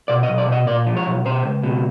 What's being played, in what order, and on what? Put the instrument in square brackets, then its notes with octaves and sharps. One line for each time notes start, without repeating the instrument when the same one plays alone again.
[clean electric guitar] B2 D5
D#5
B1
D5
B2 D#5
A#2 D5
F3
C#5
B1
B2 C5
C#2
B2